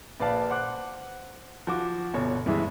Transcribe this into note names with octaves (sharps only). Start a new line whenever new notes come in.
A#1 B4 D5 F5 A5
C5 F#5 D6 F#6
F3 F#4 D6
G1 B2 C#5
E2 G2 E3 G#3 E5